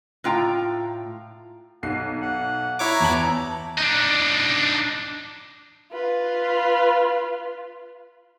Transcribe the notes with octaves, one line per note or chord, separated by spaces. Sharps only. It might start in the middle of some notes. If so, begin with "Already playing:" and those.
A2 F4 G5 A#5
B1 F#5 C7
F#5
E4 C#5 A#5 D6
E2 B3 A5 F#7
D4 D#4
F4 B4